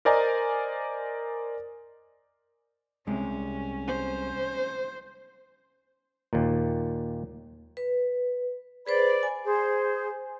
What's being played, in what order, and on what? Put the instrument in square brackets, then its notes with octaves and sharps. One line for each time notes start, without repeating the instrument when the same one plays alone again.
[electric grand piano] A#4 C5 D5 D#5 G#5 A#5
[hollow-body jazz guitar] C2 C3 G#3 [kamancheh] C#4
[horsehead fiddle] C5
[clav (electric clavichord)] D#2 A#2
[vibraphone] B4
[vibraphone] G#4 B4 C5 [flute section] D5 B5
[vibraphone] G#5
[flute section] G#4 C5